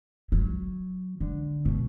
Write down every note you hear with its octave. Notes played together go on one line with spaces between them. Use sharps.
F#3
D3
B2